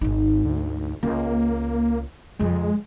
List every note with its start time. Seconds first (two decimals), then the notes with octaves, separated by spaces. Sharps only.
0.01 G#1 G#2 D#4
0.45 D2
1.03 C#2 A#3
2.39 F2 C#3 G#3